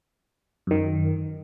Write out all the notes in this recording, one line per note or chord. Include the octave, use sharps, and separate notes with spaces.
F#2 D#3